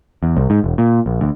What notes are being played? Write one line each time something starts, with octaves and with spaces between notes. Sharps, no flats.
E2
C2
G#2
E1
A#2
A#1
D2